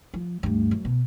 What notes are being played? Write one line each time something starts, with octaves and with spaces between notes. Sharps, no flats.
F3
D2 G2
F#2
B2